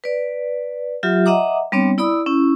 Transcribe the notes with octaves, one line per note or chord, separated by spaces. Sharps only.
B4 D5
F#3 F4 G4 E5
D#5 E5 F#5 A#5 D6 D#6
G3 B3 C4 D4 C#5
E4 D5 B5 D#6 E6
C#4 E4